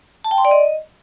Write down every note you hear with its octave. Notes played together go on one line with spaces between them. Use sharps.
A5
G5
C6
D5
D#5